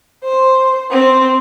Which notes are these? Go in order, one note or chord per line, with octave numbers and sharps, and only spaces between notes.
C5
C4